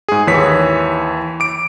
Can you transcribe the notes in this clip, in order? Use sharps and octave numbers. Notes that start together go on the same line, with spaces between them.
G#2 G#4
D#2 E3 C#5 B6
D6 D7